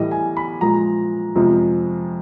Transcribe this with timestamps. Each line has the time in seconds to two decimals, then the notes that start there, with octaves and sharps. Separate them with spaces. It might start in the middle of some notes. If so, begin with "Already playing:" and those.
Already playing: A2 E3 G3 D#5
0.11 G#5
0.37 B5
0.61 A#2 F3 G#3 A#5
1.35 F2 C3 F3 G#3